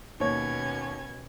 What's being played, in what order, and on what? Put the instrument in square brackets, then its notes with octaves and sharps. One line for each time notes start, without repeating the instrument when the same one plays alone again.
[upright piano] D#2 C#5 [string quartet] B2 C#4 G#6